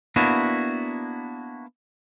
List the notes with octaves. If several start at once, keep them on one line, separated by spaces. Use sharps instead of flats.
A#3 B3 D4 E4 F#4